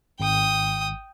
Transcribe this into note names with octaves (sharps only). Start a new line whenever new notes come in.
G#1 G5 D#6